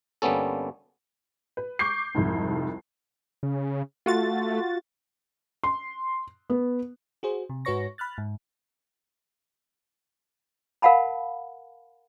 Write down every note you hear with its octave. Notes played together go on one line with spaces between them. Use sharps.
G1 G3 A#3 B3 C#4 A4
B4
C#6 D6 G6 C7
C2 F2 G#2
C#3
A3 F4 F#4 A6
C6
B3
F#4 G#4 C5
C3
G#2 F#4 B4 C#5 C#6 A#6
B5 F6 F#6 A6
G#2
A#4 F5 F#5 A5 B5